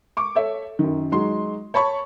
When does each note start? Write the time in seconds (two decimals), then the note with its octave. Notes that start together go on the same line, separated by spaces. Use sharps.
0.17 C#6 D6
0.35 A4 C#5 E5
0.79 F#2 D#3
1.12 F#3 G#3 D#4 C6
1.74 C#5 A5 B5 C#6